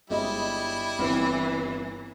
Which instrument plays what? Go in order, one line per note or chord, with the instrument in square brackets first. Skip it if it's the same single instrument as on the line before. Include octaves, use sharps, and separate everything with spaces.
[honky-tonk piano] G1 G#3 D#5 [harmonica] G3 E4
[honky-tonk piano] G1 [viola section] E3 [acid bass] C4